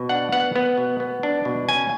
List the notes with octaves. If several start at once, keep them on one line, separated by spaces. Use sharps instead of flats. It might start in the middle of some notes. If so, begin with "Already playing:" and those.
Already playing: B2
D4 F#5
B3 F#5
B3
B2
B3
D4
B2
C#4 G#5